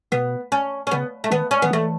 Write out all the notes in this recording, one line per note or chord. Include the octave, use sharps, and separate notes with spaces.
B2 B3
C#4
C#4
C#3 B3
A3
D#3 B3
C#4
D#3 B3
E3 A3